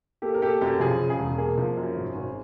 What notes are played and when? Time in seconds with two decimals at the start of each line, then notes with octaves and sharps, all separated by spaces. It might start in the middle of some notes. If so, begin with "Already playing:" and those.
0.22 A#3 G4 A4
0.34 A#4
0.42 A#3 G4 A4
0.61 F#2 G4 A4
0.80 F3 G#4
1.00 C#3
1.10 G#4
1.19 E1
1.38 A#3 G#4
1.58 F3
1.77 F#2
1.96 G#1
2.15 G#1